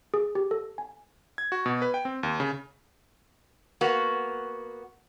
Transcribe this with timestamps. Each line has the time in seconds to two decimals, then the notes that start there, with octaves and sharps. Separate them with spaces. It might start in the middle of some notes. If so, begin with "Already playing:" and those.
0.14 G#4
0.35 G4
0.51 A4
0.78 G#5
1.38 G#6
1.52 F#4
1.66 B2
1.82 B4
1.94 G5
2.05 C4
2.23 D#2
2.40 C#3
3.81 A#3 B3 F#4